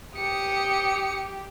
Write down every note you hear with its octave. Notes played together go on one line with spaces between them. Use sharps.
G4 D#6 C#7